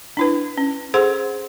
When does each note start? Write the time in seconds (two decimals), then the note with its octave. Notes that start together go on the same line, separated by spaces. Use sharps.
0.17 D4 E4 B4
0.58 C#4
0.94 G#4 A4 C5 F#5 C6